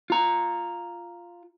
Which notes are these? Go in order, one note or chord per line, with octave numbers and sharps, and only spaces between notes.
F4 A#5